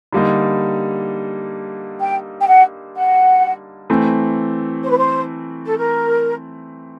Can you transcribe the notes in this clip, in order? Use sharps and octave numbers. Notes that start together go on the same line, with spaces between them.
D3 G3 A#3 D#4
G5
G5
F#5
F#5
E3 A3 C4
C5
B4
C5
A4
A#4